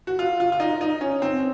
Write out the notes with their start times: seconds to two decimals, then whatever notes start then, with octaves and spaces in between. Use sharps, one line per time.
0.07 F#4
0.19 F4
0.40 F4
0.52 F4
0.60 D#4
0.81 D#4
1.01 C#4
1.22 C4